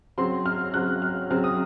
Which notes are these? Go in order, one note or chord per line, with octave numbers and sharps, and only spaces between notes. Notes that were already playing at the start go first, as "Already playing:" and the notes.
C#3 F#3 C4 C6
F6
C#3 F#3 C4 F#6
F6
C#3 F#3 C4 F6
D#6